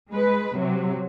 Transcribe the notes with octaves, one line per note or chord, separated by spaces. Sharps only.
G#3 B4
C3 F#3